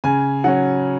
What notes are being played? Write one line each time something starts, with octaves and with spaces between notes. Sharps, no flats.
C#3 G#5
F#3 C#4 F#5